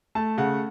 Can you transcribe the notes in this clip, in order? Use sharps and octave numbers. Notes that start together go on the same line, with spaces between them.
A3 A5
C#3 F#5